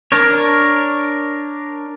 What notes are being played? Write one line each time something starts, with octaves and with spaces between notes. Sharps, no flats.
D4 A#4 C#5